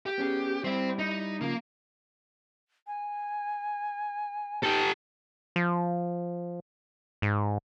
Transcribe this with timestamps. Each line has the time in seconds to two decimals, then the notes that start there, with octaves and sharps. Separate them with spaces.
0.06 G4
0.18 B3 C#4 G#4
0.64 G3 C4 E4 C5
0.99 D#4
1.41 C#3 F3 A#3
2.87 G#5
4.63 D#4 G4 A4
5.56 F3
7.22 G#2